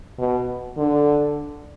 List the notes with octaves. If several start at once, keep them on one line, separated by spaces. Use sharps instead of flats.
B2
D3